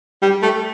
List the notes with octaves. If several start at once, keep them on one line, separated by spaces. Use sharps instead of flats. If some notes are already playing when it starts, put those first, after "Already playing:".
G3
A3